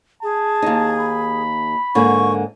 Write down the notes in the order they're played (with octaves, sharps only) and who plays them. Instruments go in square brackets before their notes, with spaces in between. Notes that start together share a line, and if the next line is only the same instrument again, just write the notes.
[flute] G#4 [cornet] A5
[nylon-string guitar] D#2 D#4
[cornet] B5
[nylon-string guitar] G#2 D3 A#3 [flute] C#6